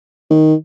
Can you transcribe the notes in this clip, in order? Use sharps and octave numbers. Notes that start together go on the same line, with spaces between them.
D#3